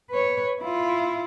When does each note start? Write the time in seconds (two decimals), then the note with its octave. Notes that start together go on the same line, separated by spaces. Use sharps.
0.10 B4 C#5
0.61 E4 F4